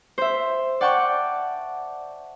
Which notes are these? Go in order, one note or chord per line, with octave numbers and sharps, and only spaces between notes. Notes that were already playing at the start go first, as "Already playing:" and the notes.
C5 E5
D5 F#5 G5 A5 C#6